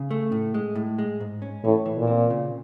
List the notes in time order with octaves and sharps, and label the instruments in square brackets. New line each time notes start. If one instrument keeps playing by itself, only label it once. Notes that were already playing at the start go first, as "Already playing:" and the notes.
Already playing: [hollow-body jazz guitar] C#3
A3
A2
G#3
A2
G#3
G#2
C#4
[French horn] A2 [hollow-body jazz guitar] E3
[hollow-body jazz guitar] E3
[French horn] A#2
[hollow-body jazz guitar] C4
C#3